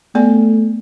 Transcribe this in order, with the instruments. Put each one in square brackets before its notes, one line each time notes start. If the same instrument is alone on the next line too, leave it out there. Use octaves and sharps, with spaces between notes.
[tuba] A3 [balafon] B3 D5 G#5